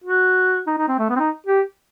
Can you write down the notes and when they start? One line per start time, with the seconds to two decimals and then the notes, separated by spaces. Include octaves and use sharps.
0.04 F#4
0.67 D#4
0.78 D#4
0.88 C4
0.99 A3
1.09 B3
1.16 C4
1.20 D#4
1.46 G4